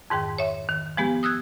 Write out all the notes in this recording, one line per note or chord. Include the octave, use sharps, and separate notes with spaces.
F2 G#2 D#3 G5
C#5 E5
D#3
F3 G#3 B3 G4
D#6 E6 F#6 G#6